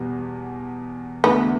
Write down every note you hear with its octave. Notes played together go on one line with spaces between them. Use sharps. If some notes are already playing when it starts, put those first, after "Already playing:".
Already playing: E2 B2 G3
E2 D3 A3 B3 D4 F#4